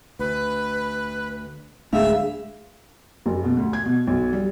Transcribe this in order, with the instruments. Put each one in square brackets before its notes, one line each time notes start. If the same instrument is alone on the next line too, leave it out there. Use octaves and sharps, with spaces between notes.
[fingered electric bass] D2 [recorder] B4
[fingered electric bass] D1 A3 D4 [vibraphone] G#3 G#4 F5 [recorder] E5
[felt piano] F#1
B2
D2
G#6
B2
B1
G3